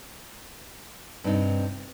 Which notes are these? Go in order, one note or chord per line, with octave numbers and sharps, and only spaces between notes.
G2 C3 C4 D4 D#4